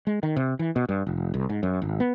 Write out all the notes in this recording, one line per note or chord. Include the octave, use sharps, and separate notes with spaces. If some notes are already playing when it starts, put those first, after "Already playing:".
G#3
D#3
C3
E3
B2
G2
F1
C2
G#2
F#2
G#1
B3